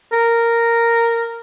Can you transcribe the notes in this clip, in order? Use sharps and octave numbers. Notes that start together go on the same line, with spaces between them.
A#4